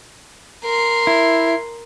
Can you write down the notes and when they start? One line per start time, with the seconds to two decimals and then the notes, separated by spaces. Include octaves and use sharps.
0.64 A#4 C6
1.07 E4